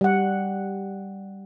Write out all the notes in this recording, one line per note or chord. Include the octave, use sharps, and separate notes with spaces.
G3 F#5